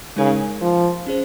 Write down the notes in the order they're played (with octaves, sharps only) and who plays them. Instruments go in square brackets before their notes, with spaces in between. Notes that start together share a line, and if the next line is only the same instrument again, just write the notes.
[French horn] C#3 [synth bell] G#3 D#4 A#4
[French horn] F3
[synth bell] C#4 G#4 C5